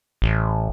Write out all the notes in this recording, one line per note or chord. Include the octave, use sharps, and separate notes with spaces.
A1